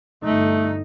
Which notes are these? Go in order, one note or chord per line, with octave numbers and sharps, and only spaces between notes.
G1 A3 D#4